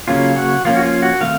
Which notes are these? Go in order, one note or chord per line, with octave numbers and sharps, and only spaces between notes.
C#3 F#3 A#3 C#4 F4
F#4
F3 A#3 C#4 F4
F#4
F4
F#4
D#3 A3 C4 F5